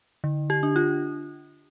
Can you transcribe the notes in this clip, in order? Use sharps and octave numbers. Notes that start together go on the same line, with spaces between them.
D3
G4
D4
F4